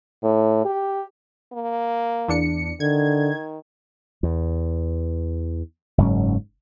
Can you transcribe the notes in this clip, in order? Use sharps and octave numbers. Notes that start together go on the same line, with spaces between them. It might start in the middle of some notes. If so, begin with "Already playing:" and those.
A2
G4
A#3
E2 D4 C#7
D3 D#3 G#6
E2
F#1 G#2 F#3 C#4